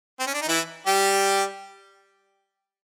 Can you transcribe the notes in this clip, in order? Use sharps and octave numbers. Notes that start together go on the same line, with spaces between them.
C4
C#4
D4
D#4
E3 E4
G3 G4